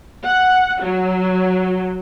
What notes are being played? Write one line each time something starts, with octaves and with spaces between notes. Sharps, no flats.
F#5
F#3